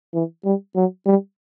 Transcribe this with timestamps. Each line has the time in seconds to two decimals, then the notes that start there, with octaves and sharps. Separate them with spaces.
0.14 E3
0.45 G3
0.76 F#3
1.06 G3